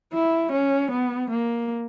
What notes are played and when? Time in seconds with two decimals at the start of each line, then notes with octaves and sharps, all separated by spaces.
0.13 E4
0.52 C#4
0.91 B3
1.31 A#3